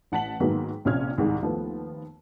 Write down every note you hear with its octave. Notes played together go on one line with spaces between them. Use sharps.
A1 F#5 A5 B6 F#7
G#2 D#3 F#3 G#3 A#3 B3
A#1 C3 C#4 F4 F6 G#6
C2 G#2 D#3 G#3
D#2 F3 A3 B3